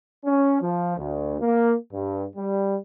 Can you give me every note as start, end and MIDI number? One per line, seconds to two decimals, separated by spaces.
0.25 0.60 61
0.61 0.96 53
0.98 1.35 38
1.41 1.73 58
1.92 2.23 43
2.35 2.76 55